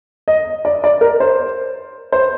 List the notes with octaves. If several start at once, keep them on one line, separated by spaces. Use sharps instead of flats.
D#5
D5
D5
A#4
C5
C5